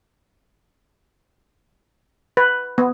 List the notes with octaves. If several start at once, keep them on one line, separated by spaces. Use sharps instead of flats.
B4
B3